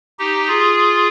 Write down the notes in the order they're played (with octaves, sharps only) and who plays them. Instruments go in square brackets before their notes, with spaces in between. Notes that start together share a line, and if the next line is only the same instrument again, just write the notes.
[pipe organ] D#4 G4
F4 G#4